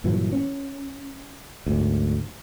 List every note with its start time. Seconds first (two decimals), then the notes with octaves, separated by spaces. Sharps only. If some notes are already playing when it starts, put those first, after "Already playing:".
0.04 G2 A#2 E3 F#3
0.32 C#4
1.66 D2 G#2